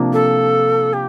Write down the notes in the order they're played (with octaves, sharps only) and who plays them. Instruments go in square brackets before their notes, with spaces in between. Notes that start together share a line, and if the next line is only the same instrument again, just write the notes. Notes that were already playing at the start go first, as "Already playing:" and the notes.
Already playing: [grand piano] C3 F3 A#3 D4
[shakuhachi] A4
G4